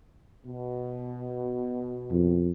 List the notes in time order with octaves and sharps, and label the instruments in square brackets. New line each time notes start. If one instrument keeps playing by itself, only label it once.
[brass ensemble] B2
[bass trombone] F2